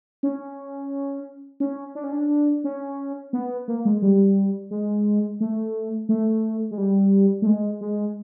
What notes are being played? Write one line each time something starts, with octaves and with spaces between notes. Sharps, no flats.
C#4
C#4
D4
C#4
D4
C#4
B3
A#3
G#3
G3
G#3
A3
A3
G#3
G3
A3
G#3
G#3